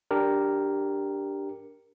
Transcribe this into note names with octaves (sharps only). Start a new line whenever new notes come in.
D4 G4 A#4